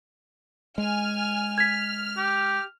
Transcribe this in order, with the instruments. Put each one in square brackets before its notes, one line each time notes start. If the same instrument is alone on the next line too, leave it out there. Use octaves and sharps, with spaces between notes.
[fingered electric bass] G#3 [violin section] G#5 F6
[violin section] F6 [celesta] G#6 B6
[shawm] G4